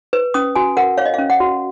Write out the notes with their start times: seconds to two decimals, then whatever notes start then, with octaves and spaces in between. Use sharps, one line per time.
0.13 B4
0.34 C#4 D#6
0.56 F#4 G#5
0.77 A#4 F#5
0.98 C#5 F5
1.06 D#5
1.14 C#4 F5
1.30 F#5
1.40 F#4